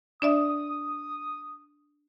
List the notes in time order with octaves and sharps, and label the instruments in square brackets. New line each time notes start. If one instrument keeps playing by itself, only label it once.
[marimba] D4 D5 E5 [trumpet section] D#6